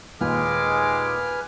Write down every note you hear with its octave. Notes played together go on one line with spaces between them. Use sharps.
D#2 A#2 G#3 B4 G#5 D6 F6